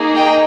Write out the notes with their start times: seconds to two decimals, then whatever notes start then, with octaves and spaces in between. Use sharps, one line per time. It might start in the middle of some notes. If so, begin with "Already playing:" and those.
Already playing: A#3 D#4 G#4
0.14 D#5 G5